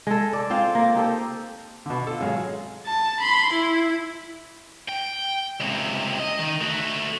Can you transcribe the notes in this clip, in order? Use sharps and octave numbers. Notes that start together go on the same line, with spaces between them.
G#3 A4
A4 D5
C4 F4 C5 F5
A#3
D#4 G4 A4 C5
B2 D3
F4 A4
G#1 F#3 G#3 G#4 F5
A5
B5 C6
E4
G5
C#2 C3
D#5
D#3
A3 F#4